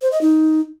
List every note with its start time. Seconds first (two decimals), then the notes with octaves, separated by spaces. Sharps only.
0.02 C5
0.12 D#5
0.21 D#4